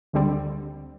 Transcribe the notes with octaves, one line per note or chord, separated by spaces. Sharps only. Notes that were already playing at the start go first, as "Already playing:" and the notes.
D2 D3 G3 C4